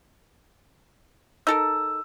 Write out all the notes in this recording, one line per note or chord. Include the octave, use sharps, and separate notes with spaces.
D#4 A4 A#4 E6